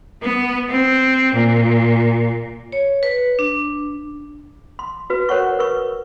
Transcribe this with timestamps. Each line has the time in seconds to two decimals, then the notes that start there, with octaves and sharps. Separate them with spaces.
0.20 B3
0.69 C4
1.33 A#2
2.72 C#5
3.03 B4
3.39 D4
4.79 C6
5.10 F#4 B4
5.29 A#4 C5 C#5 F#5 C#6
5.59 A#4 B4 C#6